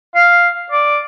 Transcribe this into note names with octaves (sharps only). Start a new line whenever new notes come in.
F5
D5